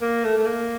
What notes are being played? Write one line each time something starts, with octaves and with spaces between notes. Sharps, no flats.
A#3
A3
A3
A#3